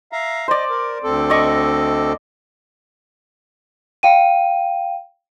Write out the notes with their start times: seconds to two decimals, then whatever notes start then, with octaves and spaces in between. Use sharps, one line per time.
0.12 E5 F5 A#5
0.48 C5 D5 D#5
0.70 A#4
1.04 D2 C4 A4
1.30 D5 D#5 C#6
4.03 F5 G5 D#7